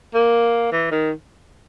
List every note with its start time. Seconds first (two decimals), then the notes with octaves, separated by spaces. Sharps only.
0.14 A#3
0.72 E3
0.91 D#3